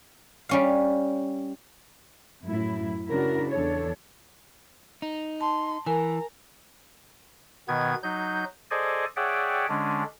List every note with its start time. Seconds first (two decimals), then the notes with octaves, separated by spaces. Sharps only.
0.49 G3 C#4 F5
2.45 F#2 A2 F#3 E4
3.10 C#3 D4 E4 F#4 A#4
3.51 E2 D4 A4 C#5
5.02 D#4
5.41 A5 C6
5.86 E3 A#4 G#5 A#5
7.68 B2 D#3 B3 G#6
8.03 F#3 D#4 G6
8.71 G#4 A4 C5 D5 D#5 G#5
9.17 G#4 C#5 D5 E5 F#5 G5
9.69 D3 G#3 C#4 D4